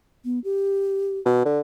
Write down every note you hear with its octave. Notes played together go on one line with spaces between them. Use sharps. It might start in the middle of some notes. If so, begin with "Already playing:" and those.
B3
G4
B2
D3